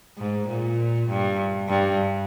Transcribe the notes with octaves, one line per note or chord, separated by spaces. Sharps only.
G#2
A#2
G2
G2